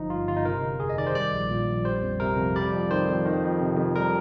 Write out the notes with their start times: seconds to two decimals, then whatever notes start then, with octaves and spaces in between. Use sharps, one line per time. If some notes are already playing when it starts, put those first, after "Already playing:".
Already playing: G1 F3 D#4
0.09 G2 F4
0.28 G1 F4
0.37 D#4
0.45 C3 A#4
0.62 G1
0.80 F2 G#4
0.89 D#5
0.97 D#3 D5
1.07 C5
1.15 G3 D5
1.33 A#1
1.50 A#2
1.68 A#1
1.85 G3 C5
2.02 F2
2.20 C3 A#4
2.37 F2
2.56 G3 D5
2.73 F2
2.91 D#3 C5
3.08 F2
3.26 D#3
3.43 F2
3.61 C3
3.77 F2
3.96 G3 A#4